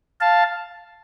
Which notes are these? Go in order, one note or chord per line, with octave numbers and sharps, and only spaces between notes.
F5 A5